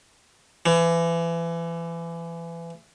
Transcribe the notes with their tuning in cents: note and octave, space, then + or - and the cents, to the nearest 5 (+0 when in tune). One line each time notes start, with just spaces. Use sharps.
E3 +30